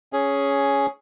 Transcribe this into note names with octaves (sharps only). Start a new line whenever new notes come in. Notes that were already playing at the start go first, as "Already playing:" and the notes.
C#4 G#4